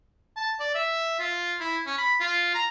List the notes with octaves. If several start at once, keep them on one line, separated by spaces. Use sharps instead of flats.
A5
D5
E5
F4
E4
C#4
B5
F4
A#5